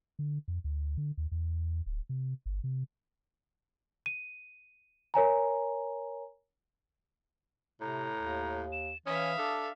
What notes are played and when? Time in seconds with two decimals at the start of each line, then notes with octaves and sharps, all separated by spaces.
0.19 D3
0.48 F2
0.64 D2
0.97 D3
1.17 D#2
1.32 E2
1.86 D1
2.09 C3
2.46 G1
2.64 C3
4.06 D#7
5.14 A#4 C#5 G#5 A#5
7.81 A2 C3 A#5
8.18 D#2
8.72 E7
9.06 E3 C#4 E5 F5 D#6
9.38 D4 A4